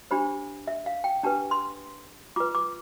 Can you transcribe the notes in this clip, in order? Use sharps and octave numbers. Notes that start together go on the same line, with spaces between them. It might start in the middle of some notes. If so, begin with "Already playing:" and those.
D4 G4 C5 B5
E5
F5
G5
D4 G4 B4 A5
C6
F4 B4 D6
D6